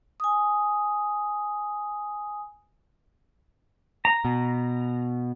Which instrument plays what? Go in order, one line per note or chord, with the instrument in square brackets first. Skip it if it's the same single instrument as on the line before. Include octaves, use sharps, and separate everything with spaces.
[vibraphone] G#5 D#6
[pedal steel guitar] A#5
[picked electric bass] B2